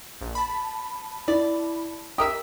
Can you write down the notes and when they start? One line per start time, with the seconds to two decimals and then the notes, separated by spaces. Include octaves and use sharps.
0.21 A#1
0.35 A5 B5
1.28 E4 D5
2.18 G4 A#4 E5 D#6